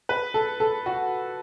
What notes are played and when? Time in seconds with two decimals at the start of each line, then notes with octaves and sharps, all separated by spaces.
0.09 B4
0.34 A4
0.60 A4
0.86 F#4